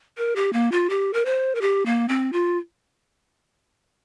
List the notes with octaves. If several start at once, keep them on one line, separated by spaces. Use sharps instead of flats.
A#4
G4
A#3
F4
G4
A#4
C5
A#4
G4
A#3
C4
F4